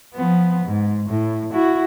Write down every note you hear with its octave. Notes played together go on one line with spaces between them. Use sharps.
F3 B3
G#2
A2
E4 F#4